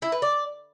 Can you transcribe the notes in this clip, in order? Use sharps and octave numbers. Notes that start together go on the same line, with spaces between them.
E4
B4
D5